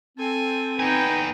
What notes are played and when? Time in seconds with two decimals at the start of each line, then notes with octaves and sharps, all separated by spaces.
0.18 C4 A4 G#5
0.80 B3 D#4 B4 G5 G#5